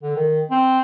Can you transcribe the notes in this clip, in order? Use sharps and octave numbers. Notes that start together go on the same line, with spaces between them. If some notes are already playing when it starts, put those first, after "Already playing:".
D3
D#3
C4